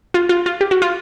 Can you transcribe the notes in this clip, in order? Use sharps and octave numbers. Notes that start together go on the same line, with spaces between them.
F4
F4
F4
G4
F#4
F4